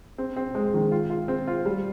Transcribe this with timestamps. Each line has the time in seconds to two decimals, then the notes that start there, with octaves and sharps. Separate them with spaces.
0.18 C4
0.36 C4
0.55 G#3
0.74 D#3
0.92 F4
1.10 F4
1.28 C4
1.47 F4
1.65 G3